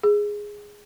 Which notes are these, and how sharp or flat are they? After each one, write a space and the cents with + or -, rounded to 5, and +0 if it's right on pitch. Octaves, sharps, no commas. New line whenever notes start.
G#4 -5